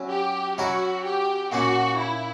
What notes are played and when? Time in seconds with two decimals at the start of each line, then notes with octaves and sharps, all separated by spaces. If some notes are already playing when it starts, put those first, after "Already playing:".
Already playing: F#3 C#4 E4
0.10 G4
0.57 F#3 C#4 E4 F#4 A#4 C#5
1.04 G4
1.52 A#2 A#3 C#4 F#4
1.99 E4